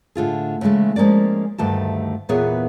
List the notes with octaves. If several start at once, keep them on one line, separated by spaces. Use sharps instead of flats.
A2 D3 F4 G#4
C#3 E3 F#3 G#3 A3
F3 G#3 A#3 C#4 D5
D2 G2 D#3 A3 G4 A5
E2 A#2 E3 B3 G#4 C#5